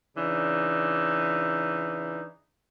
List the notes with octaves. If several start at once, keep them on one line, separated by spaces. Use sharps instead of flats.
C#3 E3 D4 D#4